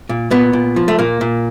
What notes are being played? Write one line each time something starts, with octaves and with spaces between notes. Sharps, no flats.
A#2
A#2 B3
A#2
F3
A3
A#2 A#3
A#2